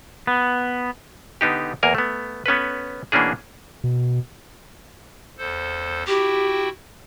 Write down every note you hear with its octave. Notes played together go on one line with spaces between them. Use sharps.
B3
D3 B3 D#4 G4
E2 A#3 A#4 G#5
A3 B3
B3 C#4 A4 B4
B2 E3 A#3 C#4 D4 G#4
B2
E2 A4 C5
E4 F#4 G4 G5